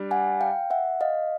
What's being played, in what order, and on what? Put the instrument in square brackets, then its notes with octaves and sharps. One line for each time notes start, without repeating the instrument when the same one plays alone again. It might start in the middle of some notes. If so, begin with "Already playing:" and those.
Already playing: [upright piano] G3 D4
[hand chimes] F#5 G#5
F5 G5
E5 F#5
D#5 F5